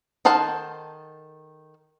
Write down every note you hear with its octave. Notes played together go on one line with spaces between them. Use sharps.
D#3 A4 C5 F#5 A5